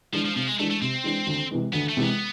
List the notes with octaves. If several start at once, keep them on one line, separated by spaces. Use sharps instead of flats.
E3 F3 G#3 D4
F3
C3 F3
G#3
E3 G#3 A3 D4
A3
C3 C4
E3 G#3 D4
D2
C3 E3 G#3
D2 B3
A3
C3 E3 G#3
B3